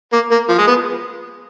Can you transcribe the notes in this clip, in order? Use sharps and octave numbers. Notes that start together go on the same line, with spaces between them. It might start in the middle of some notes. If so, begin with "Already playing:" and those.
A#3
A#3
F3
G#3
B3